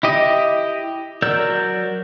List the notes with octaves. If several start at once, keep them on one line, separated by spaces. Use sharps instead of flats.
E4 G4 D#5
F#3 A#4 D5 E6 G6